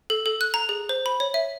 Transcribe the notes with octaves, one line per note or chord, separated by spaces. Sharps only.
A4
A4
F#6
A#5
G#4
C5
B5
C#5
E5